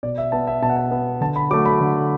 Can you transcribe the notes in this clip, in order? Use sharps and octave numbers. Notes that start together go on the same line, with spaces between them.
B2 D5
E5
B3 A5
E5
B2 A5
F#5
A5
B3
D3 A5
B5
F#3 A3 D6
B5
D3